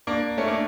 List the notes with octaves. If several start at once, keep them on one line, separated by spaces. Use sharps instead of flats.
A#3 D4
A3 C#4
A#3 D4